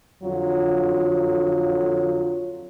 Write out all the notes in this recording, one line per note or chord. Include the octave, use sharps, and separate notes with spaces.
F2 D3 F#3 F4